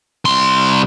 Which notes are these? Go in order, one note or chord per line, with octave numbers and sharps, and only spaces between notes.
C2 C6